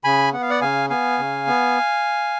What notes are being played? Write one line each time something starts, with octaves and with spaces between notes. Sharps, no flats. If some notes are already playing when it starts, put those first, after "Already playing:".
C#3 G#5 B5
B3 F#5
F5
D5 F#5
C#3 F5 G#5
B3 F5 G#5
C#3
B3